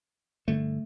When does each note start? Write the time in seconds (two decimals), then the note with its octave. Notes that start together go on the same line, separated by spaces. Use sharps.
0.48 G2 D3 A3